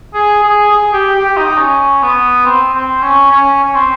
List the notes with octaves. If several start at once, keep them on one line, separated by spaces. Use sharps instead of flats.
G#4
G#4
G#4
G4
G4
D#4
C#4
B3
C4
C4
C#4
C#4
C#4
C4